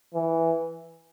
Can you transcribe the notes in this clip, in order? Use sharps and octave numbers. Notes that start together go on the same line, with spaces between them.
E3